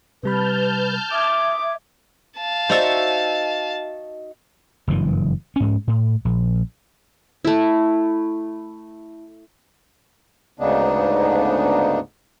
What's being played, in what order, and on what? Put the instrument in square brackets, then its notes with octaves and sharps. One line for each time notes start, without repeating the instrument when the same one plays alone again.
[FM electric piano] C3 G3 B5 [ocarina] B4 [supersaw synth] A5 F6 G6
[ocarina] E5 [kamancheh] D6 [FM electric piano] D#6 G#6
[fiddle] F5 A5
[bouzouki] D#4 F#4 E5 [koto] C5 D5 A#5
[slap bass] F#1 G2 E3
G#2 C#4
A2
A#1
[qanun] A3 E4
[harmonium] D2 G#2 C#3 B3 D4 D#4